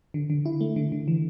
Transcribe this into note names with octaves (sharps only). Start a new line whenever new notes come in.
D3
D3
E4
A3
D3
D3
E3